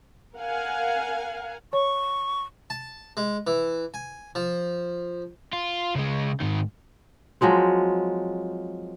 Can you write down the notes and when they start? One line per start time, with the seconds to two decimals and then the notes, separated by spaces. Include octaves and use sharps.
0.36 A#4 F5 F#5 G#5
1.73 C#5 C#6
2.70 A5
3.17 G#3
3.47 E3
3.94 G#5
4.35 F3
5.53 F4
5.95 C#3 G#3
6.40 G#2 D#3
7.41 F3 F#3 G#3 C4